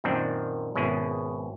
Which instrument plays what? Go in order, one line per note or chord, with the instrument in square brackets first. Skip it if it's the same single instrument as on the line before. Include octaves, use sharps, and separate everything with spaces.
[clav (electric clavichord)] F#2 A#2 D#3 C4 D4
G#1 B2 C#4 E4 G#4